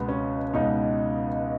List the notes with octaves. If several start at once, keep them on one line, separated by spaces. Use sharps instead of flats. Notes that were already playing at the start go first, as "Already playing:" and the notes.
Already playing: C#2 B2 B3
C#4
C#2 B2 D#4